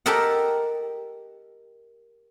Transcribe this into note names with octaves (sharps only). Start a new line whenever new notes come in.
G4 A4 A#4 D#5 F#5